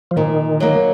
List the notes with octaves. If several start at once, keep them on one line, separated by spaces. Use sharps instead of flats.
F3
A#2 D#3
F#3 A#3